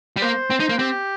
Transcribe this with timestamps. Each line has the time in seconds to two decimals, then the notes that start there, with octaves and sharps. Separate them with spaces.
0.16 G3
0.21 A#3 C5
0.50 C4
0.60 D#4
0.69 A#3
0.79 C4 G4